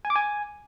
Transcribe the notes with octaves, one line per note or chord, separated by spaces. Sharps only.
G#5
D6
G#5